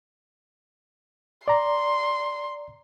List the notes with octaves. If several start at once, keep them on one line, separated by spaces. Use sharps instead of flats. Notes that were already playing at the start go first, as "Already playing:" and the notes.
D5 A#5 C6